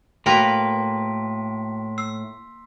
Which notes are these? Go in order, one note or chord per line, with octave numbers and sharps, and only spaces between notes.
A2 A#3 F#4 A#4 B4 G5 C6 B6
E6 C7